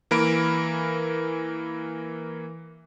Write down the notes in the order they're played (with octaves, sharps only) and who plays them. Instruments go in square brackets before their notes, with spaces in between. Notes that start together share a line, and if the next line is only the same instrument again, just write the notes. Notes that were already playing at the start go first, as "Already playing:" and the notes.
[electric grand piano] E3 A#3 A#4 B5 D7